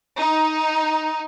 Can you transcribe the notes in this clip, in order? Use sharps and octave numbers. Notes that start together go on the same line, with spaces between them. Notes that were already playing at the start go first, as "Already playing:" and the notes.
D#4